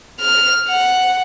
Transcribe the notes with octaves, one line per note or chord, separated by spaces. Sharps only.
F6
F#5